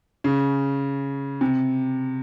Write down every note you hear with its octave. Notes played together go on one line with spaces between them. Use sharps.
C#3
C3